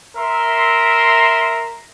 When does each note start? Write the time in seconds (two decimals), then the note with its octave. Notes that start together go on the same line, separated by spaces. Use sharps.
0.17 A#4 E5 C6